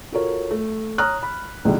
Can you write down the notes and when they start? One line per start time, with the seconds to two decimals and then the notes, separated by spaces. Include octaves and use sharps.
0.12 F4 F#4 A4 A#4 C#5
0.51 A3
0.98 C#5 A#5 D#6 F6 F#6
1.23 B5
1.65 C#2 G#2 B2 D3 E3 G3